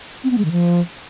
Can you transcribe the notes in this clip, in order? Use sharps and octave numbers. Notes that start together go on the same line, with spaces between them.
C4
B3
G#3
D#3
F3